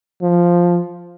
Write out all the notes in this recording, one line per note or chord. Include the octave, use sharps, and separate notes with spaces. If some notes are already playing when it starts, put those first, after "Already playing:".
F3